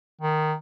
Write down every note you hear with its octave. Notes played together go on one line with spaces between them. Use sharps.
D#3